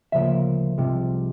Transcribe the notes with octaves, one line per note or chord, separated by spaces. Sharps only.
D2 C#3 F3 A#3 E5
C2 C3 F3 G#3